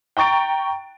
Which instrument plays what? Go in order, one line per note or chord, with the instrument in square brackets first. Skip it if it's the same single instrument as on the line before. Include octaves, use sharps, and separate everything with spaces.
[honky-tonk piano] G5 A#5 C#6 A6 D7